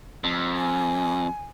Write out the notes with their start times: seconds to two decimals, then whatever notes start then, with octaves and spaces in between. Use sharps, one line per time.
0.24 F2
0.57 G#5